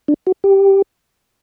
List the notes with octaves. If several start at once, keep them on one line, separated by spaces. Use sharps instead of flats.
D4
F#4
G4